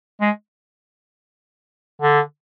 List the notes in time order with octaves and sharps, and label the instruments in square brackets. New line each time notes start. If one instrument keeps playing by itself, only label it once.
[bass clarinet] G#3
D3